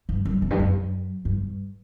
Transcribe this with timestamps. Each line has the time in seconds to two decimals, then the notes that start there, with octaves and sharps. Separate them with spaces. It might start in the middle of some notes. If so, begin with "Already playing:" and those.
0.09 G2
0.25 F#2
0.42 E2
0.51 G2
0.59 F#2
1.25 G2